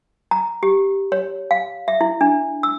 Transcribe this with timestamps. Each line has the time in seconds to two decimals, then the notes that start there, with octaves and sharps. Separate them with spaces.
0.31 A#5
0.63 G4
1.12 C#5
1.51 F5
1.88 E5
2.01 E4
2.21 D4
2.63 E6